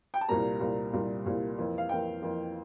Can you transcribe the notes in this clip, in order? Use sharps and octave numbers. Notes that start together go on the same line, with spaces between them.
G5
A5
C2 A#2 G3 A#3 A#5
C2 A#2 G3 A#3
C2 A#2 G3 A#3
C2 A#2 G3 A#3
F2 E3 A#3
F5
F2 E3 A#3 G5
F2 E3 A#3